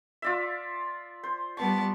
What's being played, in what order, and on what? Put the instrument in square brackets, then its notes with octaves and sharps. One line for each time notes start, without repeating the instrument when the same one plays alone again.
[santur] F4 D5 E5
C5
[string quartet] G3 B3 A5 [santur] C#6